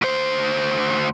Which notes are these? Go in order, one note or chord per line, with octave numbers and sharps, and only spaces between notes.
D2 C5